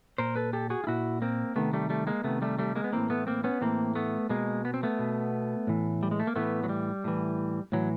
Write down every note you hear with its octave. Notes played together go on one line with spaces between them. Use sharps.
A#2 A#4 C5
A4 B4
G4 A4
F#4 G#4
F4
A#2 E4 F#4
A#3 C4
C3 D#3 A3 B3
G3 A3
G3 A3
G#3 A#3
C3 D#3 A3 B3
G3 A3
G3 A3
G#3 A#3
B3
A2 E3 A#3 C4
A3 B3
A#3 C4
B3 C#4
A2 E3 A#3 C4
A3 B3
B2 G#3 A#3
B3
C4
A3 B3
B2
A2 E3
G3
G#3
A3
A#3
A2 E3 A3 B3
F#3
G3
A2 E3
A2 E3 F#3